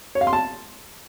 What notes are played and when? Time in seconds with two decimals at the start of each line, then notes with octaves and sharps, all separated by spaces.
0.15 C#5
0.21 F5
0.27 C6
0.33 A5